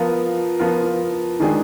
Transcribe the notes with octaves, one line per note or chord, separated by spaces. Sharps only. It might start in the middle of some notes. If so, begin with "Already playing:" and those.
Already playing: F3 B3 F4 A#4
F3 B3 F4 A#4
D#3 G#3 D4 G#4